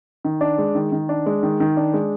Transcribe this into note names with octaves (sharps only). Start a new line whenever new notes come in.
D#3
D4
G#3
D#3
D#3
D4
G#3
D#3
D#3
D4
G#3